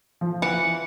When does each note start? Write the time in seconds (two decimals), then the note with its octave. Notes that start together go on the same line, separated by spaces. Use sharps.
0.21 F3
0.42 E3 F#5